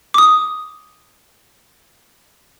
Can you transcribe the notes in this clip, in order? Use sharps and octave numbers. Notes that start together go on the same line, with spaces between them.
D6 D#6